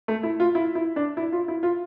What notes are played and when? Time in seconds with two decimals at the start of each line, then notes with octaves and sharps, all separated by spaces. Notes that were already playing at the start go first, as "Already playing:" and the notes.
0.08 A3
0.23 E4
0.40 F4
0.55 E4
0.75 E4
0.96 D4
1.17 E4
1.32 F4
1.48 E4
1.63 F4